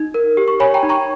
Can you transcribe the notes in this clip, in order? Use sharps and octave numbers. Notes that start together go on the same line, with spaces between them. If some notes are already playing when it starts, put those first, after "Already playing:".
Already playing: D#4
A#4
G4
C#6
C#5 G#5 B5
G5 A#5
D#4
A#5 C#6